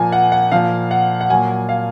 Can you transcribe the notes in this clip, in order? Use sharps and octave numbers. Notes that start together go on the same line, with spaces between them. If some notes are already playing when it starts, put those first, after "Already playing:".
Already playing: A#2 F3 G#5
F#5
F#5
A#2 F3 F5
F#5
F#5
A#2 F#3 G#5
F5